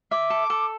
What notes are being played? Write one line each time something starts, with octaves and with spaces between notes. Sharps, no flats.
E5 D6
A4
A4